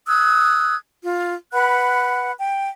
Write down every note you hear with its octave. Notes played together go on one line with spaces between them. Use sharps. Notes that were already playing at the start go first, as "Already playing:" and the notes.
D#6 E6 F#6 G#6
F4
B4 F#5 B5 F#6
G5